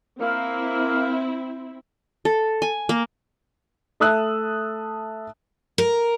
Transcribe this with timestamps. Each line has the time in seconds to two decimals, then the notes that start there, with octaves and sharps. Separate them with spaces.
0.21 A#3 C4 E4 F5
2.25 A4
2.62 G#5
2.89 A#3
4.00 A3 E5 A5 D#6 E6 F#6
5.78 A#4